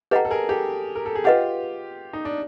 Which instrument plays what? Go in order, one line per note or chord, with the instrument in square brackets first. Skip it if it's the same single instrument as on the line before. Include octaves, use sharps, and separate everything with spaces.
[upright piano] G4 A4 [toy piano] B4 D#5 F#5 A#5
[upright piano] A4
G#4 A#4
G4 A4
A#4
A4
G#4
[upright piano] F4 G4 [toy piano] B4 D#5 F#5
[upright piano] D#4
D4